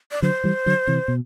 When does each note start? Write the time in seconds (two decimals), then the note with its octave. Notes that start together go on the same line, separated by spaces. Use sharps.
0.12 D5
0.22 D3 F#3 C5
0.44 E3 G3
0.66 D3 F#3
0.87 C3 E3
1.08 B2